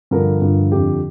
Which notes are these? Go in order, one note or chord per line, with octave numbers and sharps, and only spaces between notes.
G2 D3 F3 A#4
G2 D3 F3
F2 D3 F3 G4